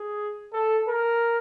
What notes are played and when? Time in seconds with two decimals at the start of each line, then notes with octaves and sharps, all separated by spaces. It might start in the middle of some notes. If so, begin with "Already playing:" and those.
Already playing: G#4
0.53 A4
0.88 A#4